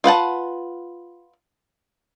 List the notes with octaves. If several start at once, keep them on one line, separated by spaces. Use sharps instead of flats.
F4 B4 F#5 A5